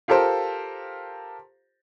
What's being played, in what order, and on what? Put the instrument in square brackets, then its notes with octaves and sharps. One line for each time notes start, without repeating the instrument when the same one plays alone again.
[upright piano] F4 G4 A4 A#4 C5